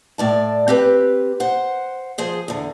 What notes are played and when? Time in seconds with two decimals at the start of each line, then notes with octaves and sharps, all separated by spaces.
0.18 A2 D5 A5
0.68 C4 G4 B4
1.40 C5 F#5
2.18 F3 G#4 C5
2.48 E2 D3